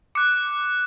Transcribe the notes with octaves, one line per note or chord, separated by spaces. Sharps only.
D6 F#6 C#7